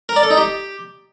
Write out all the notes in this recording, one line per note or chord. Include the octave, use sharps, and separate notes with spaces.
A#4
D5
A4
D#4
G4